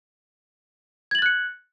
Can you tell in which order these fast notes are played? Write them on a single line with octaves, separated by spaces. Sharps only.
G#6 F#7 A6 F#6 C#7